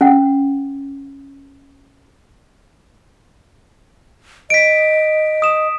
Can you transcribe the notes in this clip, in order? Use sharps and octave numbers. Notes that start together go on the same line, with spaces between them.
C#4 F#5
D#5 B6 D7
D#6 E7